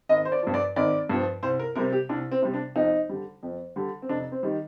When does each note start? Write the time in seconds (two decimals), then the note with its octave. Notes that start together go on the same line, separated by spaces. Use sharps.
0.09 G#1 D#5
0.25 C5
0.32 D5
0.43 G2 F3
0.54 D5
0.76 G#1 D5
1.09 G2 F3
1.42 C2 C5
1.59 A#4
1.75 C3 G3 A#4
1.92 G4
2.09 C2 D4
2.32 C4
2.42 C3 G3
2.54 D4
2.76 F2 D#4
3.09 D3 G3
3.43 F2
3.76 D3 G3
4.02 C4
4.09 F1 D4
4.32 C4
4.43 D#3 G3